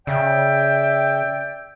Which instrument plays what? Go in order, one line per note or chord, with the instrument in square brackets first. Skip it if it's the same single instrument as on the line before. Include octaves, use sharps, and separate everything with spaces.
[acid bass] C#3 [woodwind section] D5 E5 G5